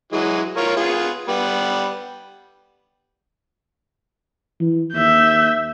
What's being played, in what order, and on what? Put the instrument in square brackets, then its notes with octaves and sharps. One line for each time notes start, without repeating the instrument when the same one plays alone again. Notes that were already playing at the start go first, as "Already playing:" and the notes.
[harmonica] E3 F#3 G#3
F4 A#4 C#5
B3 F4 G#4
G3 B3
[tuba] E3
[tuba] D#2 [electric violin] E5 G6